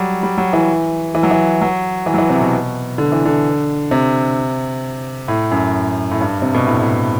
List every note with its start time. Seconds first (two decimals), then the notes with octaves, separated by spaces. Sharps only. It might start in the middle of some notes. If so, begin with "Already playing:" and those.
Already playing: F#3 G3
0.23 G3
0.38 F#3
0.53 E3
1.15 E3
1.23 F#3
1.31 E3
1.61 F#3
2.06 E3
2.14 F#3
2.18 E3
2.30 C3
2.41 B2
2.98 D3
3.12 E3
3.25 D3
3.91 C3
5.28 A2
5.51 F#2
6.11 A2
6.21 G2
6.42 C3
6.55 B2
6.67 A2
6.82 A2